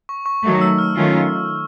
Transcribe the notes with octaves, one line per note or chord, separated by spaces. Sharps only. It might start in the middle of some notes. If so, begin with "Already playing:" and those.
C#6
C#6
D#3 F#3 A3
E6
F6
D#3 F#3 A3 C#4 F4